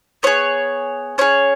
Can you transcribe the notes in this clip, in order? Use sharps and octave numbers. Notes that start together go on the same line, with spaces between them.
B3 G#4 C#5
C#4 G#4 C#5